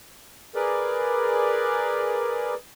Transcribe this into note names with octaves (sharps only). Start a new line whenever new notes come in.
G#4 A#4 B4 D5